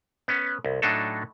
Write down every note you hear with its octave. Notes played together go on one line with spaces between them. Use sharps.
B3 C#4
C2
A2 F#3 D4 D#4 A4